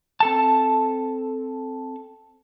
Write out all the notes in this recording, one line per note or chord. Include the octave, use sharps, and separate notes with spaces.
C4 A4 A5